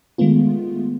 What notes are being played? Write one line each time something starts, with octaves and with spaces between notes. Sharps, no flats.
D#3 G#3 A3 B3 F4